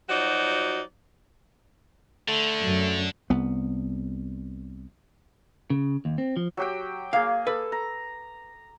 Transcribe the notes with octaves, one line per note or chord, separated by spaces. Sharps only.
F3 F#3 D#4 F#4 D5
D3 A3
F#2
C2 B3
C#3
D#2
C4
F3
F#3 G4 G5
A#3 G#4 F5
A4 B4
A#5